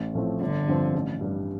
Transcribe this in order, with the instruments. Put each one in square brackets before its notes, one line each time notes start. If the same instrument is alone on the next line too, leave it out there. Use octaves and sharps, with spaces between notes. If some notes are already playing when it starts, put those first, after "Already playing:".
Already playing: [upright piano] A1
A2 F3 A3 C4
[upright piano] G1 [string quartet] D3
[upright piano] G2 F3 C4
A1
G2 G3